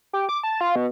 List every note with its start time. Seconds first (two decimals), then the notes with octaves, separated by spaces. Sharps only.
0.13 G4
0.29 D6
0.43 A5
0.61 F4
0.76 B2